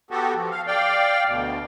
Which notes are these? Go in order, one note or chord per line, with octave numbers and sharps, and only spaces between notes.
B3 F#4 G4 A4
F3
F5
D5 F5 G5
D2 B2